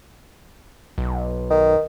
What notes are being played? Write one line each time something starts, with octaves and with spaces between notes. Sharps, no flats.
B1
D#3